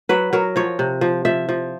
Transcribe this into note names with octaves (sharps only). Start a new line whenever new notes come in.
F#3 B4
F#3 A#4
F3 C#5
C3
F3
F3 E5
F3